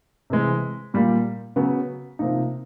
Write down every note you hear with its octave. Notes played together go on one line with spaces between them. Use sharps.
C3 E3 G#3
A#2 G3 A#3
C#3 F#3 B3
C3 F3 A#3 D#4